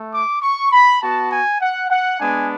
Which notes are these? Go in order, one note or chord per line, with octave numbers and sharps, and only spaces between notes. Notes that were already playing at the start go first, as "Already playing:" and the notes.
Already playing: A3
D6
C#6
B5
B3 F#4 A5
G#5
F#5
F#5
G#3 B3 D4 G#5